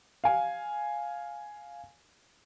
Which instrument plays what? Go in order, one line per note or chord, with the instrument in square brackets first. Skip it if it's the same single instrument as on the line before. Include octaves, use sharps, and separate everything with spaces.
[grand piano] F5 G#5